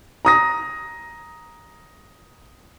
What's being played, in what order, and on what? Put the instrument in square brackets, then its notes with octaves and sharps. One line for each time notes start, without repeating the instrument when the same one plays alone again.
[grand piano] A#5 D#6 A#6